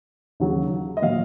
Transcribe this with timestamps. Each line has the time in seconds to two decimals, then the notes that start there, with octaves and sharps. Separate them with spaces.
0.40 D#2 C#3 F#3
0.97 D#5
1.02 A#2 F#3 F5